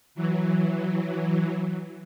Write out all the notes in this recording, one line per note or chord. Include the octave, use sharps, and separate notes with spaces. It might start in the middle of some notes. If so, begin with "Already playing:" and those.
E3 F#3